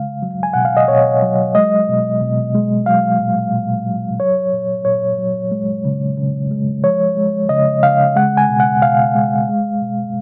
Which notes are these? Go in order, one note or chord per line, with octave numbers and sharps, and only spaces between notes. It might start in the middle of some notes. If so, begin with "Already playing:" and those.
Already playing: C#3 G#3 F5
F#3
G#5
B2 F#5
F5
D#5
B2 C#5
F#3
G#3 D#5
B2
B2
G#3
F#3 F5
A#2
A#2
F#3
F#3 C#5
A#2
A#2 C#5
F#3
G#3
C#3
C#3
G#3
F3 C#5
G#3
C#3 D#5
C#3 F5
G#3 F#5
G#5
B2
F#5
B2 F5
G#3
G#3
B2